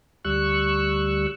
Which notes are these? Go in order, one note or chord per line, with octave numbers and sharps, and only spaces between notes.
D2 G3 C#6 E6 F#6